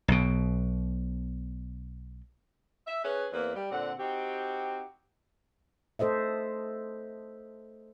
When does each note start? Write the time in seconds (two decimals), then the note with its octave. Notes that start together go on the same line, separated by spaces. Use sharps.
0.08 B1 B2
2.87 E5
3.04 C#4 G#4 B4
3.33 E2 A#3 C4 B4
3.55 G3
3.72 A#2 D3 C4 F#5
3.98 C4 D#4 F#4 G4
5.99 A3 A4 C5 D#5 E5